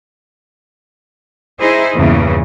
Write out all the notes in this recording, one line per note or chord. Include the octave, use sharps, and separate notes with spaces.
D#4 E4 G#4 C5
E2 G2 A#2 C#3 E3